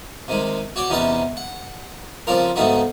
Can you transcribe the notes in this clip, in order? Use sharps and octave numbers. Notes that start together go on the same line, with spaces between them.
C3 D#3 G#3
F#4 C#5 D5 G5
E2 C3 C#4 D#4 B4 A5
F#5
C#3 F3 C4 D4 F4 A#4
G#2 C#3 A3 B3 D#4 F#4